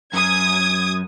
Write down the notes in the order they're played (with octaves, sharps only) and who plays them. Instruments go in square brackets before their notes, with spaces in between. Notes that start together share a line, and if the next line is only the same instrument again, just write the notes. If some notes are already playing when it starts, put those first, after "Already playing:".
[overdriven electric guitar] F#2 [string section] D#6 G#6